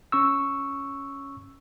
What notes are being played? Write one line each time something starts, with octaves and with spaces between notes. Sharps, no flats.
C#4 C#6 E6